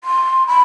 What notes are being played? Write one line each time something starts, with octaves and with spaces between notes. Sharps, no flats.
C6
B5